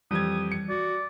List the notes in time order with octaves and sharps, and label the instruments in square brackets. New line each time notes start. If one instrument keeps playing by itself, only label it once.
[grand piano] F2 G4 G#6 [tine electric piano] E3 G3 [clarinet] D#6
[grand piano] C#7
[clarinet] F#4 [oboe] D5